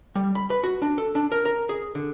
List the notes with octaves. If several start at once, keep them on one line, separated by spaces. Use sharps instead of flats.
G3
B5
B4
F#4
D4
A4
D4
A#4
A#4
G#4
D3